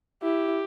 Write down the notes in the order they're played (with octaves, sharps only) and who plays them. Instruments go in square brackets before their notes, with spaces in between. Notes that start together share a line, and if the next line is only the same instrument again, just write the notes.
[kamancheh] E4 [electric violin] G4